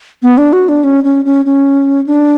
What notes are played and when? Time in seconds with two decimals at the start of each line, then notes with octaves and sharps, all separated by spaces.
0.23 B3
0.38 D4
0.53 F#4
0.69 D4
0.84 C#4
1.04 C#4
1.25 C#4
1.45 C#4
2.07 D4